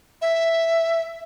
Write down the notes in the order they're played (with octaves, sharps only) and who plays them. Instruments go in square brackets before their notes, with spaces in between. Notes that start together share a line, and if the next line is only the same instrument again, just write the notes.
[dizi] E5